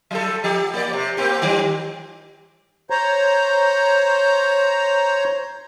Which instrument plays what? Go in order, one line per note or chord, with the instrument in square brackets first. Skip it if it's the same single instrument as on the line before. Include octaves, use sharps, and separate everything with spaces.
[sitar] F#3 G3 A4
F3 G4
A#3 D5
C3
A#3 C4 G4
D#3 G3
[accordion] C5 C#5 A#5